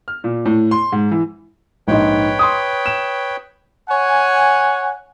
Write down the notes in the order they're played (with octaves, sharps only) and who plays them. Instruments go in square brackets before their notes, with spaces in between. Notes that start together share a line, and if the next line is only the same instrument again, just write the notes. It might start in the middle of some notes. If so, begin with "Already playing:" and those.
[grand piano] F6
A#2
A2
C6
G#2
E3
[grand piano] A#1 G#2 [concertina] B4 C#5 G5
[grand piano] C6 D#6
E7
[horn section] C#5 F#5 G#5